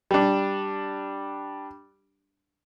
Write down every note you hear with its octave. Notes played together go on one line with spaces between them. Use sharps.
G3 D4